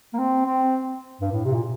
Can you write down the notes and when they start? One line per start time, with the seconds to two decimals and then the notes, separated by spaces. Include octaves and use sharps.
0.13 A#3
0.18 C4
0.46 C4
1.21 G2
1.32 A2
1.45 C3
1.54 A#2